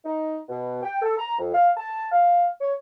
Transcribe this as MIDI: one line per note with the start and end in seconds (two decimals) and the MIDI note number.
0.05 0.36 63
0.48 0.81 47
0.82 1.00 79
1.02 1.14 69
1.18 1.34 82
1.39 1.54 41
1.54 1.69 77
1.77 2.07 81
2.11 2.47 77
2.60 2.73 73